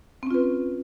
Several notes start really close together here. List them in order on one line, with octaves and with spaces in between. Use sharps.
C4 C#4 F4 B4